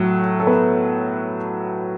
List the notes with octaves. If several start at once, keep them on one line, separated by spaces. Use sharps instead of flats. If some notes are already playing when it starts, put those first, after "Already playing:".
Already playing: A2 F#3 A3
A4
B3 B4